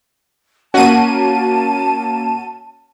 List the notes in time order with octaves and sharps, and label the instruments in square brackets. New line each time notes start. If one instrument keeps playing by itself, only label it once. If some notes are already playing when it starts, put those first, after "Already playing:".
[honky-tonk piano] A#3 C#4 [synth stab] F#4 D#7 [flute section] A5